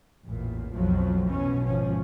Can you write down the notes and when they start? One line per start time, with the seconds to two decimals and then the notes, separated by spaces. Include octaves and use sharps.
0.24 A1 E2 A#2
0.75 B1 F2 F3 F#3
1.30 B2 E3 C#4
1.65 G#1 F3 C#4